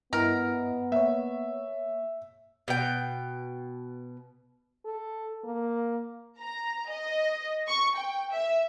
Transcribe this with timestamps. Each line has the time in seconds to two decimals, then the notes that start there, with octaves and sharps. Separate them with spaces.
0.13 G2 B3 E4 A#4 D#5
0.92 A#3 C#5 E5
2.68 B2 G5
4.85 A4
5.44 A#3
6.40 A#5
6.89 D#5
7.68 C#6
7.97 G5
8.31 E5